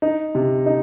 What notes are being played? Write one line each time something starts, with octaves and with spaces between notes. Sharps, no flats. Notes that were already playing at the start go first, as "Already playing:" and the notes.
D#4
C3
D#4